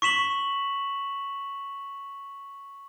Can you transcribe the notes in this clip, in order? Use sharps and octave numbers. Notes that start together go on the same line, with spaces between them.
C#6 B6 E7 F#7